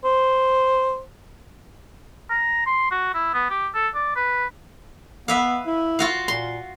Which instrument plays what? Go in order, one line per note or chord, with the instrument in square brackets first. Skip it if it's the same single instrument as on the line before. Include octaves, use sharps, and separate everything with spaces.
[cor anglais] C5
[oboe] A#5
C6
F#4
E4
B3
G4
A4
D5
B4
[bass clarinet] B3 [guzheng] B4 E5 F5
[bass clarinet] E4
[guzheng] F4 F#4 F5
[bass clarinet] A#2 [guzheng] C6